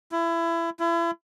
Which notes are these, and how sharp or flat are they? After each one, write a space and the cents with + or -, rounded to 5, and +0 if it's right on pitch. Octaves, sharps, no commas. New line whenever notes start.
E4 +25
E4 +35